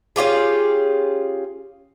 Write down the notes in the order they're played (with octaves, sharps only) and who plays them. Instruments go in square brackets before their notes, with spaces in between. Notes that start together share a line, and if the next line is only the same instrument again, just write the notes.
[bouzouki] C#4 F4 G4 G#4